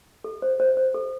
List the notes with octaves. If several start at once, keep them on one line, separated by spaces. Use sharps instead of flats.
A4
C5
C5
C5
A4